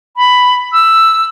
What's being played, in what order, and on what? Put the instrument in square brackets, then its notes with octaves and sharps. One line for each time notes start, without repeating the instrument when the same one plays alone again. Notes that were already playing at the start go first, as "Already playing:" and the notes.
[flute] B5
E6